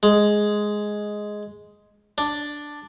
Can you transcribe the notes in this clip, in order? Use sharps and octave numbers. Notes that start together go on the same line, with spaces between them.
G#3
D4